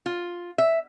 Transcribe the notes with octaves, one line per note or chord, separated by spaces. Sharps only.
F4
E5